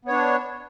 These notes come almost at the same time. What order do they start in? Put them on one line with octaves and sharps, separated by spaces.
B3 C#5 D4